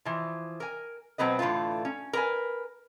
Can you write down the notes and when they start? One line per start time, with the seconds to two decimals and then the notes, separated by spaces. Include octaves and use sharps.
0.05 E3 F3
0.60 A#4 G#5
1.18 B2 F#3 B3 C4 B4 D#5
1.39 A2 D3 E3 A3 F4
1.85 C#4
2.13 A#4 B4 G#5